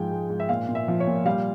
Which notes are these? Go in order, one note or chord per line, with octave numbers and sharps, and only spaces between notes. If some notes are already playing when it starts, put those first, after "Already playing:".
Already playing: G#2 F3 G5
G#3
G#2
E5
A#2 F5
A#2
E5
F3
C#5
A#2
G3 F5